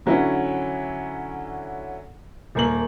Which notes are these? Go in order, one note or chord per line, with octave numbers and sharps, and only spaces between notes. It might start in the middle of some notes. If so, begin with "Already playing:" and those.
D3 F#3 C#4 E4
D#1 A#3 F#7